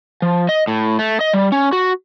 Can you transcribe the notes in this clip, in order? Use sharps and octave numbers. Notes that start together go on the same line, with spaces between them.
F3
D#5
A2
A3
D#5
G3
C#4
F#4